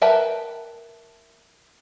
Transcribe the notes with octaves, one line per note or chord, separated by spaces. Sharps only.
A#4 B4 E5 G5 A5